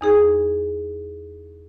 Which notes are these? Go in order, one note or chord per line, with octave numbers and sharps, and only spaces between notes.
E2 D#4 G#4